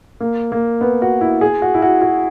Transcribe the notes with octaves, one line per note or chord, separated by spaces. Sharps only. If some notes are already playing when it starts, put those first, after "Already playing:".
A#3
A#3
B3
F#4
E4
G#4
F#4
E4
F#4
F#4